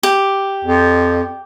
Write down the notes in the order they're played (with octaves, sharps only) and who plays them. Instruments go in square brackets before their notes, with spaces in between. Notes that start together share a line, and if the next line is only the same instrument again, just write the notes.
[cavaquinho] G4
[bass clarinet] F2